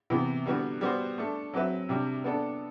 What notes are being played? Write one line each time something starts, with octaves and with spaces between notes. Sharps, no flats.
C3 E3 B3
D3 G3 B3 F#4
G3 B3 F#4 C5
A3 D4 A4
F#3 C4 F#4 B4 E5
C3 G3 D4
B3 D4 A4 D5